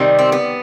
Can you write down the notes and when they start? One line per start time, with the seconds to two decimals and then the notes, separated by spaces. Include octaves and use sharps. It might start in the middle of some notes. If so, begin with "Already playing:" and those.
Already playing: C3 D#3 G3
0.19 C4
0.32 B3